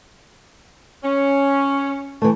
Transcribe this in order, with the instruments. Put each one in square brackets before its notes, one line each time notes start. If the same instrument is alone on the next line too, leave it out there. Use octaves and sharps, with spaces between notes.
[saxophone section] C#4
[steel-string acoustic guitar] E3 A3